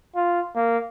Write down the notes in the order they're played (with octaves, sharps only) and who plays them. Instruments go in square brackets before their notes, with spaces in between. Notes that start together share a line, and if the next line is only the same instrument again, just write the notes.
[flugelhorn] F4
A#3